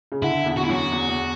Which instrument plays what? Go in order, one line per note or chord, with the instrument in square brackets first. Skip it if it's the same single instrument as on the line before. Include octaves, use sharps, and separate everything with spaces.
[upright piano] C#3
[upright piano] D3 [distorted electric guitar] E4
[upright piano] E2
[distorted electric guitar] F#4
E4
[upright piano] F#2 [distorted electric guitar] F#4
[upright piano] E2
E2